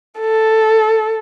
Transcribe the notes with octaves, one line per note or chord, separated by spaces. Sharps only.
A4